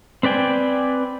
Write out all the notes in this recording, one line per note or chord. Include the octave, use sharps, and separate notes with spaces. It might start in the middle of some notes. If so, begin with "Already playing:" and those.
C4 B4 D5 G5 G#5